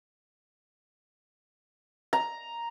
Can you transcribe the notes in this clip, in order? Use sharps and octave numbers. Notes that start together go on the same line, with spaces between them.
A#5